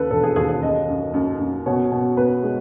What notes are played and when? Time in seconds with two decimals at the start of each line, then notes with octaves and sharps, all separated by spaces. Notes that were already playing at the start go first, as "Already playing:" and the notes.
Already playing: D#2 C#3 A4 B4
0.10 E1 A4
0.24 G#4
0.36 D#2 G#4
0.49 G#4
0.63 F#2 D#5
0.89 F#2
1.14 F#2
1.40 F#2
1.66 B2 C#5
1.92 B2
2.17 B2 B4
2.43 G#3